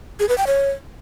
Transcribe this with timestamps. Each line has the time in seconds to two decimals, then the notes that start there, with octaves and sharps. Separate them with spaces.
0.20 G#4
0.29 B4
0.38 G5
0.47 C#5